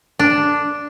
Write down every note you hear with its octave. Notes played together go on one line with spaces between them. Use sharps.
D4